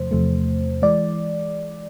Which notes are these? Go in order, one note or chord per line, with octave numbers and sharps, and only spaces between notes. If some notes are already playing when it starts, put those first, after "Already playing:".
Already playing: E2 C3 F3 A3 C5
E2 C3 F3 A3
E3 G#3 D5